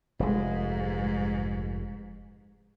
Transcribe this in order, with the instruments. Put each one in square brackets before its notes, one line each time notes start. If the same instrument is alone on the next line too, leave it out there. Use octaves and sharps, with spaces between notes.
[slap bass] F1 G#3 [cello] G#2